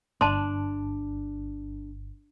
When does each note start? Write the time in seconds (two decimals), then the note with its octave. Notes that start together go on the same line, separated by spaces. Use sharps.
0.21 G1 D4 A5 C6